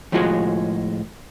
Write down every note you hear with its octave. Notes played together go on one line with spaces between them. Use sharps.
A2 F3 G#3 F4 F#4 G#4